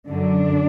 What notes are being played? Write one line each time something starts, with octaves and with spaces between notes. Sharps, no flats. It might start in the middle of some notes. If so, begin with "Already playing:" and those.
F#2 D3 F#3 D4